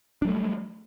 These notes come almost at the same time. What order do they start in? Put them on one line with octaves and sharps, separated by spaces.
D4 F#3 A3 G3